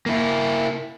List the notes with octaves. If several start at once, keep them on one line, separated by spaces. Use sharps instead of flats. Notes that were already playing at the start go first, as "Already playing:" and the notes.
A#3 E4